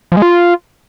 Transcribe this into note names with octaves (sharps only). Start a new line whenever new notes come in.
F3
G#3
F4